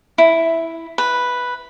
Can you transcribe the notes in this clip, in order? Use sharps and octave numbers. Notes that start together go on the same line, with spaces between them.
E4
B4